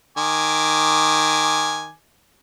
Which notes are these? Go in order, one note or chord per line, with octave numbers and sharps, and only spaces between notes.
D#3 G#5 D6